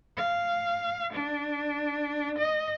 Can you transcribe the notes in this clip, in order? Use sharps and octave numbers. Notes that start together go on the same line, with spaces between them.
F5
D4
D#5